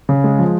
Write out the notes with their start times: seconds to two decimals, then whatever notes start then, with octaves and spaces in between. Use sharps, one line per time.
0.09 C#3
0.24 G#3
0.39 F3